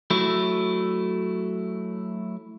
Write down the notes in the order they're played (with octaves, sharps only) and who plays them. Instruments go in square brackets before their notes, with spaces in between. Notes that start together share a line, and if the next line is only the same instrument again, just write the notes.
[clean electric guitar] F#3 A3 E4